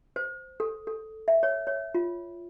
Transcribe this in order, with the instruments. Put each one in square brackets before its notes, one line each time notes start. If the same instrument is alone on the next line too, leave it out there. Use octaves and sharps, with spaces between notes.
[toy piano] C5
A4
A4
E5
C#5
C#5
F4